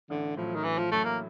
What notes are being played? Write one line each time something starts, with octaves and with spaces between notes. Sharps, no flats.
A1 D3
A2 F3 F#3
D#3
A1 E3
F3
A2 F#3 A3
A#3